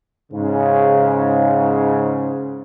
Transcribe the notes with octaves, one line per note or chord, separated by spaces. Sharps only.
G#2 C#3